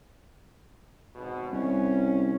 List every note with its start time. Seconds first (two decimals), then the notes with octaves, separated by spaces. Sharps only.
1.15 G#1 B2
1.52 C2 C#4